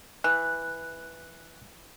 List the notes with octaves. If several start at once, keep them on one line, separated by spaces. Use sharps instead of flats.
E3 F#6